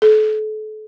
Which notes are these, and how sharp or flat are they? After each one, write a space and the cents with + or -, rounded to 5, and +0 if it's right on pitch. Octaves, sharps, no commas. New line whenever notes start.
A4 -35